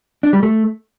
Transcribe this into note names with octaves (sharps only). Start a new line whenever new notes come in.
D4
G3
A3